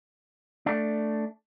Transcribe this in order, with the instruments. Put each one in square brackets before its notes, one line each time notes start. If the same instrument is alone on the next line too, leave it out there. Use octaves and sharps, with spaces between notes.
[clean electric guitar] A3 D4